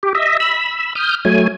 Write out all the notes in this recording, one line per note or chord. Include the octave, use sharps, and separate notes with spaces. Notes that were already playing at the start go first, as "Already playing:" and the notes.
G4
D#5 E5
B5 E6
D#6 F6 G6
F#3 A3 G#5